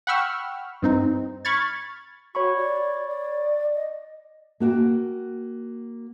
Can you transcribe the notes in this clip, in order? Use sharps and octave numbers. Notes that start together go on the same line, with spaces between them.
F#5 G5 B5 C#6 E6 F6
G2 C4 D#4
B5 C#6 F6 G#6 A6
F#4 C#5 B5 C#6
D5
D5
D#5
A#3 F#4 G5